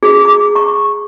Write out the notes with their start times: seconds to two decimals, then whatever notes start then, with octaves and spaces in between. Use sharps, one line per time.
0.03 G#4
0.25 D6
0.55 C#6